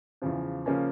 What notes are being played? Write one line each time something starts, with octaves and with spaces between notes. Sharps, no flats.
E2 C#3 F3
C#3 F3 A#3 C#4